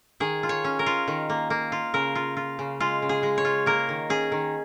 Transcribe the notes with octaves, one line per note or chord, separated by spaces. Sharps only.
D#3 G#4
F4
C#5
C#4
A#4
F4
D#3
A#3
A#3
F4
C#3 A#4
F4
F4
C#3
G#3 F4
C#3
G#4
G#3
C#5
F4
A#3 A#4
D#3
C#4 G#4
D#3